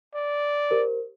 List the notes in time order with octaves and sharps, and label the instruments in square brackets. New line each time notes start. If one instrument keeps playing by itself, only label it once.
[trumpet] D5
[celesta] G4 A#4 C5